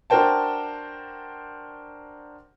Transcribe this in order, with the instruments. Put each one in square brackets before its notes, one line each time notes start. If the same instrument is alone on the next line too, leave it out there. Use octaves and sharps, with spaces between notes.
[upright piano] D4 F#4 A#4 C5 G5 A5